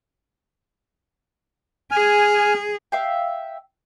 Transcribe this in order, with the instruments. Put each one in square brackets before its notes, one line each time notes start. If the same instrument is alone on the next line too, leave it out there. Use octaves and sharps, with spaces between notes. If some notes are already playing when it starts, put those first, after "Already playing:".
[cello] G#4 [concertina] G#5 F6
[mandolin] E5 F5 G5